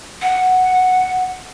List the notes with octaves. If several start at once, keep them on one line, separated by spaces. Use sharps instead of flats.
F#5